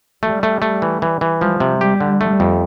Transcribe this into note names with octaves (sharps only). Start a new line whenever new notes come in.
G3 A3
A3
A3
E3
E3
E3
F3 G3
C3
G3 G4
D3
G3 A3
F2